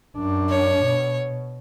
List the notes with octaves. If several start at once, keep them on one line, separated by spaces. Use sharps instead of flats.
F#2 D4
C#5
B2